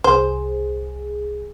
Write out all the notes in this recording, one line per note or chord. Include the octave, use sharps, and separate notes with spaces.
C2 G#4 C5